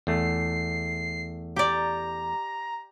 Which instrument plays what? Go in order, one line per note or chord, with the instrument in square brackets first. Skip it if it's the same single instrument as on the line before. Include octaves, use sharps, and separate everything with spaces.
[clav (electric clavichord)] E2 A3 [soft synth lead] C7
[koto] G4 D5 [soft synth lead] A#5